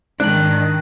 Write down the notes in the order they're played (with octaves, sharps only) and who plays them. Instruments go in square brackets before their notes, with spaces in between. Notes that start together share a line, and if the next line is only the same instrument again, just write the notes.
[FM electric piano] G#2 [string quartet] D#3 [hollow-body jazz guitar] D4 [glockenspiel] F#6 F#7